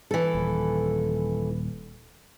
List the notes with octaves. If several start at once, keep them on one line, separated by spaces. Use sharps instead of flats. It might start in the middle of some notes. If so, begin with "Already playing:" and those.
E3 A4
D#1